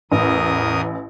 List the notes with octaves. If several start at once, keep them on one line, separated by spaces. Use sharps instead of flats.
A1 E2 A#4 D#6